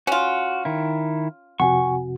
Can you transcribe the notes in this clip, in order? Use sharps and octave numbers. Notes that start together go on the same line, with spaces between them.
C#4 F4 F#4
D#3 E4
F2 C3 F#4 F#5 G#5 C#6